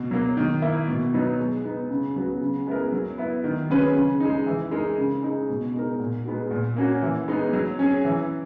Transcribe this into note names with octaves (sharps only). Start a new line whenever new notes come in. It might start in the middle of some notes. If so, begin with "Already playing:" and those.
Already playing: B2
F#3 A#3
D#3
A#3 E4
B2
F#3 B3 D#4
G#3
B3 D#4
C#3
F#3 B3 F#4
C#3
G#3 B3 E4 A#4
F#3
B3 E4
D#3
F#3 C#4 G#4 B4
C#3
G#3 D#4
E3
G#3 D#4 A#4
C#3
G#3 D#4
B2
G#3 D#4 A#4
A#2
G#3 B3 D#4 F#4
A#2
A#3 C#4 F#4
E3
G#3 B3 D#4
F#3
C#4 G#4
E3